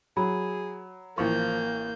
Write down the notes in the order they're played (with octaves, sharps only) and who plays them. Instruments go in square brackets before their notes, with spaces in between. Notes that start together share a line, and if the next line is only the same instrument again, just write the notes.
[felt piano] F#3 [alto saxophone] G#4 [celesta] B5
[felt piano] A1 C#6 [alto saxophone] F3 [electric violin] A#3 G6